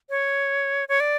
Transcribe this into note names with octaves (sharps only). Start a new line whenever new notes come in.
C#5
C#5
D5